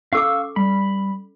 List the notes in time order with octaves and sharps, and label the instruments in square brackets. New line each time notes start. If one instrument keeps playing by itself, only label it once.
[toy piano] C#4 A4 D6 [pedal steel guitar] F5 C#6 E6
[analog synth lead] G3 [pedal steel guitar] B5